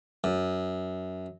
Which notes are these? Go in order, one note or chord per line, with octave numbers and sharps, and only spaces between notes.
F#2